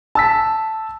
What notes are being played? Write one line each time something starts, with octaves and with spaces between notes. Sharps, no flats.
A5 E6 B6